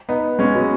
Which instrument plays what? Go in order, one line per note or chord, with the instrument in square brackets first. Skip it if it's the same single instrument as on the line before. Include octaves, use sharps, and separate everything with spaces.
[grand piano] B3 D#4
G#3 C#4
F#3 B3